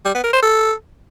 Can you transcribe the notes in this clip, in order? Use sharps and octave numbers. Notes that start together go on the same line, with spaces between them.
G3
B3
A#4
C5
A4